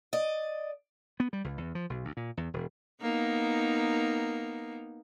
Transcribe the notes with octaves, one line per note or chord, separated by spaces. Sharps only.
D5 D#5
B3
G3
C#2
E2
F3
B1
D2
A#2
E2
E1
A#3 B3 D#4